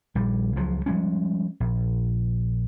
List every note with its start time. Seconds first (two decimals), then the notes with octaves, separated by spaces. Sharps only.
0.15 A#1 G3
0.56 C#2 F3 F#3
0.86 F3 G3 G#3 C#4
1.60 A#1